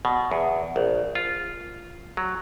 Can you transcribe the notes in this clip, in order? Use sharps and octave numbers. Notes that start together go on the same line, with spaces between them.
B2
E2
A#1
F4
F#3